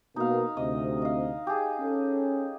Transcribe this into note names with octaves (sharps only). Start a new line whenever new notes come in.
B2 A#3 D#4 F5
D2 C3 D#5
D#5 F5
G4 G#4
C#4 A4